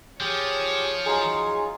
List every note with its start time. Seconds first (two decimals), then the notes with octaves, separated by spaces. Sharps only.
0.20 F3 G4 G#4 C#5 C#6
1.06 F#3 D#4 F4 G#4